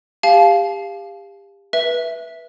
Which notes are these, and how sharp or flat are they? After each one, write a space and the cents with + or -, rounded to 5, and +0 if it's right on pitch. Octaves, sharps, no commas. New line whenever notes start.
G4 +30 F5 -5 A5 -35
B4 -20 E5 +0